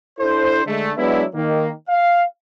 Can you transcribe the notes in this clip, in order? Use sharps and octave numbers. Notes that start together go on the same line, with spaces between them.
D4 E4 A4 C5
D3 G#3 A3
F#3 G#3 B3 D4 E4
D#3 A#3
F5